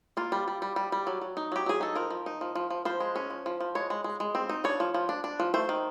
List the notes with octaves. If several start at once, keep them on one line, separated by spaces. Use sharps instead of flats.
A#3 F4
G3
G3
G3
G3
G3
F#3
F#3
D#4
F#3 G4
F#3 G#4
D#4 A4
F3 A#4
F3
D#4
F3
F3
F3
F3 C5
G#3
C#4
F3
F3
F3
G#3 C#5
G#3
G#3
G#3
C4
D#4
D4 C#5
F3
F3
D4
D4
F3
A3 C5
D#3